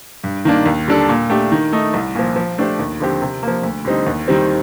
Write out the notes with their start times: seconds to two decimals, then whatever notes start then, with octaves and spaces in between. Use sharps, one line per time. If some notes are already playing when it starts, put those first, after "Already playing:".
0.24 G2
0.45 D#3 A#3 D4
0.65 D#2
0.88 D3 G3 D4 A4
1.09 A#2
1.30 A3 D4 G4
1.52 D#3
1.72 A3 D#4
1.94 C2
2.15 A#2 F3
2.36 F3
2.58 A3 D4 G4 C5
2.79 D#2
3.00 D3 F3 C4 G4
3.22 C3
3.43 F3 A#3
3.63 D2
3.85 D3 G3 C4 D#4
4.06 D#2
4.28 D#3 G3 C4